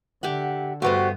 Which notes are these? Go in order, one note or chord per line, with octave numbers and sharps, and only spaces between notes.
D3 G4 E5 F#5
G2 A3 B3 F#4 G4 C5